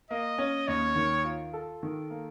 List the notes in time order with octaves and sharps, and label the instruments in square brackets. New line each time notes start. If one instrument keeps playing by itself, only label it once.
[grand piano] A#3 [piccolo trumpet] D#5
[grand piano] C#4
[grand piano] D#2 [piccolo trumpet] C#5
[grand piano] D#3
F4
A4
D#3
A#3